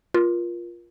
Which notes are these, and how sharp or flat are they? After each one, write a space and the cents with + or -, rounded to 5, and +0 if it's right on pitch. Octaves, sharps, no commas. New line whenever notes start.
F4 +0 A#4 +35